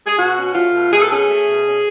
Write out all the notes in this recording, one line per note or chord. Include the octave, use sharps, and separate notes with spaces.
G#4
B2 F#4
C#4
A3 F4
B2
B2 G#4
A4
C#4 G#4
A3
B2
C#4